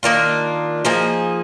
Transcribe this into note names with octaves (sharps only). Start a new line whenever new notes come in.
D#3 A#3 D4 F4
F3 A#3 D#4 G#4